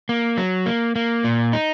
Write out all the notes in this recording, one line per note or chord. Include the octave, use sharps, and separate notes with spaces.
A#3
F#3
A#3
A#3
A#2
D#4